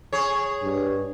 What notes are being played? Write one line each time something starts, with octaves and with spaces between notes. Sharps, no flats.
G#4 C#5
G2